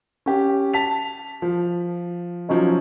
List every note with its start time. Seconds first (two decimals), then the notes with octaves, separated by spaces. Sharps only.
0.26 C#4 G4
0.74 A5 B6 F7
1.42 F3
2.49 F3 F#3 C#4 D#4